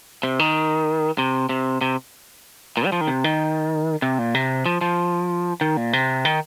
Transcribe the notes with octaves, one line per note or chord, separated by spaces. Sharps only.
C3
D#3
C3
C3
C3
A#2
G3
F3
D#3
C3
D#3
C3
A#2
C3
F3
F3
D#3
A#2
C3
D#3